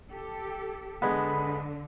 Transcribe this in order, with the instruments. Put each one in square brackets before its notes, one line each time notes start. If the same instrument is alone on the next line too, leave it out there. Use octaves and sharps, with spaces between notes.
[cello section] G4 A4
[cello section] D3 [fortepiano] G#3 B3 [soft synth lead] B5